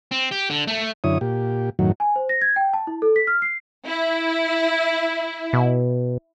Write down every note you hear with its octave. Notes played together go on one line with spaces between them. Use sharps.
C4
G4
D3
A3
F#2 D3 E4 C#5 D#6
A#2 G4
F#2 A2 D#3 F#3
G#5
C5
A#6
G#6
G5
A5
E4
A4
B6
F6
C7
E4
B2